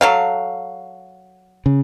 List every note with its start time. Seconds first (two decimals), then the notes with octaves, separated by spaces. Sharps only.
0.01 F#3 A4 F5
1.66 C#3